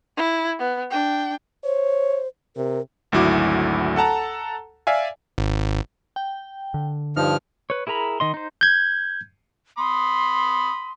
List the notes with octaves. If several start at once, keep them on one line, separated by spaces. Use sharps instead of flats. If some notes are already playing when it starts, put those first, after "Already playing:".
E4
B3
D4 G5
C5 C#5
C3 A#4
G#1 D2 F#3 E4 F#4 D6
A4 F#5 A5 A#5
D5 E5 F5 G#5
G#1
G5
D3
G2 F3 D#4 F6
B4 C#5
E4 G#4 A#4 A#5 B5
D#3 D#5 C6
D#4 C5
G6 G#6
B5 C6 D#6